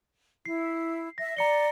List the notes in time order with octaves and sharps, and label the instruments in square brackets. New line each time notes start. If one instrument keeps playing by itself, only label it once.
[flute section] E4 [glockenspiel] C7
[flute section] E5 [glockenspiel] A#6
[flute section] D5 [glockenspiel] A#5 C#7 G7